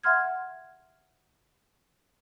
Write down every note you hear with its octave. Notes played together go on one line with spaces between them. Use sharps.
E5 F#5 C6 F6 G#6